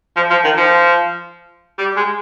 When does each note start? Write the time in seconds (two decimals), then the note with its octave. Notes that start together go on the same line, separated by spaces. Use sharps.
0.16 F3
0.30 F3
0.44 D#3
0.57 F3
1.78 G3
1.96 G#3